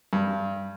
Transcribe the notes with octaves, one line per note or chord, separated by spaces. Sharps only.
G2